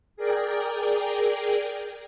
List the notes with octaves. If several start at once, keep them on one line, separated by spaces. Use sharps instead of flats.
G#4 A#4 D5 G5